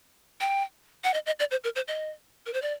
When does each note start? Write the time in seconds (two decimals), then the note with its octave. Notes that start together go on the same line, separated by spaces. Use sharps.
0.41 G5
1.04 F#5
1.14 D#5
1.26 D#5
1.40 D5
1.51 C5
1.64 A#4
1.76 C5
1.88 D#5
2.46 A#4
2.53 C5
2.62 D5